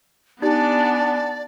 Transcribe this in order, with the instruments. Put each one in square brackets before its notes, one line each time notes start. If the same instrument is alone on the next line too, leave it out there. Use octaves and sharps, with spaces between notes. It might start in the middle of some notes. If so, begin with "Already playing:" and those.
[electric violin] B3 D4 [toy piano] D#4 G4 [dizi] D5 [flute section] F#5 G#5 A5